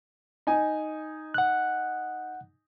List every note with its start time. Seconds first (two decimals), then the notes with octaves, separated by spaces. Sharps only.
0.47 D#4 G#5
1.34 F#5 F#6